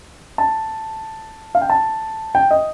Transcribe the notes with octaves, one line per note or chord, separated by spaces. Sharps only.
A5
F5
G5
A5
G5
D#5